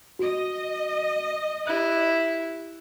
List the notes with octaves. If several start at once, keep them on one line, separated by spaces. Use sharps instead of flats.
F#4 D#5
E4 G4 F#6